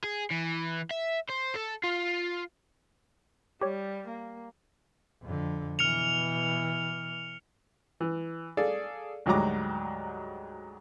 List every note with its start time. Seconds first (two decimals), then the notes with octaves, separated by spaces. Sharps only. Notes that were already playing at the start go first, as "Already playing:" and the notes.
0.04 G#4
0.31 E3
0.91 E5
1.29 C5
1.55 A4
1.83 F4
3.61 G3 G4 C#5
4.08 A#3
5.23 F2 D3
5.79 B2 E3 F6 C#7 F7
8.00 E3
8.57 G#4 A4 D5 F5
9.26 D2 G#2 F#3 G3 A#5 D6